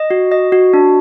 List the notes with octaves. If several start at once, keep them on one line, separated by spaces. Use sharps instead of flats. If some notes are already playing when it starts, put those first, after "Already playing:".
Already playing: D#5
F#4
D#5
F#4
D4